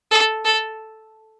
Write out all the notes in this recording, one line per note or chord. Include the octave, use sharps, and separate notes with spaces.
A4
A4